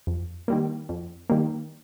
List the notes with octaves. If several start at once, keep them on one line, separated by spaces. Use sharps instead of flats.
F2
D#3 G3 A#3
F2
D#3 G3 A#3